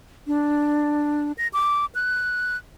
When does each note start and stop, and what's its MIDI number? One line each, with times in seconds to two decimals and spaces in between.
0.27 1.32 62
1.38 1.48 94
1.53 1.86 86
1.95 2.57 90